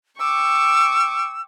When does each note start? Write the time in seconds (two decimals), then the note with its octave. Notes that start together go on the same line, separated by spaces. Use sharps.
0.20 G5 C#6 D6 E6